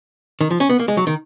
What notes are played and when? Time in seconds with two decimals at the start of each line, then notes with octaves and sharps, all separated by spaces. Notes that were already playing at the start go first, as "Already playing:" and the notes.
0.41 D#3
0.51 F3
0.60 C#4
0.69 B3
0.79 A#3
0.88 G#3
0.97 F#3
1.07 D#3